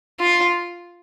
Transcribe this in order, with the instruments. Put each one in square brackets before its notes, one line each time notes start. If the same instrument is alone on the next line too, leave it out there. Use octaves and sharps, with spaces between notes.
[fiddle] F4